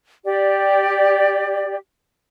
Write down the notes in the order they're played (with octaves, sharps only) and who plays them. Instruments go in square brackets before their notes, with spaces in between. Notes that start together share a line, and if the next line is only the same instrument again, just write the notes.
[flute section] G4 D5